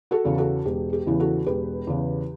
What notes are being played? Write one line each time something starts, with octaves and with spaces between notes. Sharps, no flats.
F#4 A4
E2 C#3 E3
F#4 A4
E1 G4
G4
E2 C#3 E3
F#4 A4
E1 G4 B4
E2 C#3 E3